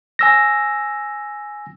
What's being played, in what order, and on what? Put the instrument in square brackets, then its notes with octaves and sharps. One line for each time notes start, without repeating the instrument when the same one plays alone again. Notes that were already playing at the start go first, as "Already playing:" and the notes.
[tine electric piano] G#5 E6 A#6